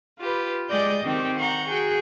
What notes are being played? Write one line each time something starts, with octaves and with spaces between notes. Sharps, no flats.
F4 G4 B4
G#3 G4 D5 D#5 G6 A6
D#3 C4 G4
F#5 A#5 C#6 G6
F#4 G#4 G5